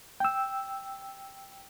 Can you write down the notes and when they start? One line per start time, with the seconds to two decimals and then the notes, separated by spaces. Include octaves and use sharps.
0.20 G5 E6